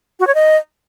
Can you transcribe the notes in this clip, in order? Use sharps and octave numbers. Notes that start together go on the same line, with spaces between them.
F#4
C#5
D#5